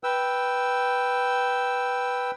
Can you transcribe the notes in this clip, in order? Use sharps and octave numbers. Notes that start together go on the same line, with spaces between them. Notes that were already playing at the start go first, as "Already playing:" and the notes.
B4 G5 E6